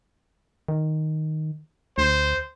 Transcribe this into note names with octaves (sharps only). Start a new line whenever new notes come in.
D#3
D2 C5